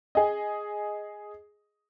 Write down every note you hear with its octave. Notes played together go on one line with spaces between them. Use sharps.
G#4 D#5